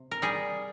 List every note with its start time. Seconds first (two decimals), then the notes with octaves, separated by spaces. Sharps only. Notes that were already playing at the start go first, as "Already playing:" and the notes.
Already playing: C3
0.11 A#4
0.22 G3 G#4